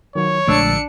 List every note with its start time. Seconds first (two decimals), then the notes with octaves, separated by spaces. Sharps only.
0.16 D#3 F#3 C#5
0.48 A#1 A#2 D3 G#3 A3 D4 E6 C#7